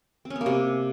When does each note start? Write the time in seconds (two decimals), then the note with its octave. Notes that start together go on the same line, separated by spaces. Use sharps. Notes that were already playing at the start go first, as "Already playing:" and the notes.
0.25 C4
0.30 C#4
0.36 B3
0.41 A#3
0.46 C3